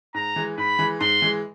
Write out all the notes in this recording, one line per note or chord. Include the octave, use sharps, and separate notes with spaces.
G#2 A#5
E3 G#3
G#2 B5
E3 G#3
G#2 C6
E3 G#3